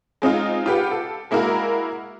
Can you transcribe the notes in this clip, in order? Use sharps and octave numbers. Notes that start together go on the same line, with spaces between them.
G#3 C4 D#4 F4
F4 G4 B4 F#5
A4
G#3 A#3 E4 F#4 A#4 F5